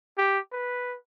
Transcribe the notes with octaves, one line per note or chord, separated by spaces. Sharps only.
G4
B4